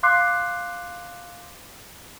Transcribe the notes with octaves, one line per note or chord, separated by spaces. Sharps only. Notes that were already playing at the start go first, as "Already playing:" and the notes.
F5 C6 D6 F#6 C7